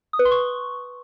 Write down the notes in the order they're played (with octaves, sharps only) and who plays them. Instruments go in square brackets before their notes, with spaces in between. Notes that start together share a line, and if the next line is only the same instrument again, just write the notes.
[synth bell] D#6
B4
C6
C#6